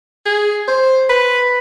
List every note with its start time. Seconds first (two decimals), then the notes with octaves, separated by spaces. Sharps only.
0.26 G#4
0.68 C5
1.10 B4